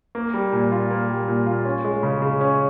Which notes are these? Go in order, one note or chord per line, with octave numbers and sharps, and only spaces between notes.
A#3
G3
A#2
F4
A#3
G3
A#2
F4
C#4
G#3
C#3
C#3
C#4